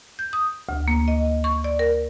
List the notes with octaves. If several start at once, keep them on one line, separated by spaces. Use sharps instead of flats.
G6
D#6
D2
A#3
D#5
C#6
D5
A#4